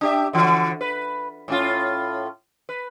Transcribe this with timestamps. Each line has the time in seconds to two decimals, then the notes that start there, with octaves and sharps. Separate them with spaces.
0.01 D4 G4 E5
0.33 D3 E3 F#4
0.81 B4
1.48 A2 C#4 F4
2.69 B4